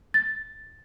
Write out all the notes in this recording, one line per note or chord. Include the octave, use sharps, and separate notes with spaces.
A6